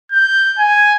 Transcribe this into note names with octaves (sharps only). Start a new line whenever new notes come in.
G6
G#5